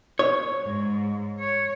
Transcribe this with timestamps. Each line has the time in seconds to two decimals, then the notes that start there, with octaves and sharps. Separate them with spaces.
0.19 C#5
0.62 G#2
1.39 C#5